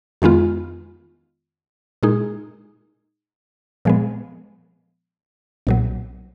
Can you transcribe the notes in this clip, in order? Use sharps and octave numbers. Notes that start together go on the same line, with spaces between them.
F2 D#3 G#3 B3 F4
A#2 G#3 D#4 G#4
A#2 F3 G#3 B3
B1 A#2 F#3